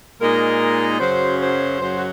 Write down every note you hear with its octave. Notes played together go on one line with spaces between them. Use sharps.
A#2 G#3 D#4 A#4
F#2 C#3 F#3 C5
C5
F#2 C#3 F#3 C5
F#4